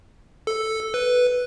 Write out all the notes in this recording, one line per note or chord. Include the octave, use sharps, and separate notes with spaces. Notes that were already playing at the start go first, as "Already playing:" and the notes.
A4
B4